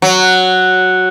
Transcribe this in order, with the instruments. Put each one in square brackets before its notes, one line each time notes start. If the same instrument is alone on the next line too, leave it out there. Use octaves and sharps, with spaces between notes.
[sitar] F#3